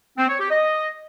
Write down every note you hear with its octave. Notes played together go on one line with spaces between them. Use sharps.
C4
C#5
G4
D#5